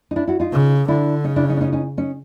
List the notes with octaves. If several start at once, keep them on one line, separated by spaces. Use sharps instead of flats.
D#4
D4 E4
E4 F#4
D#4 F4
C#3
D3 D4 E4
C#3 C#4 D#4
D4 E4
C#4 D#4
D4
C#4 D#4
C#4 D#4
C#4 D#4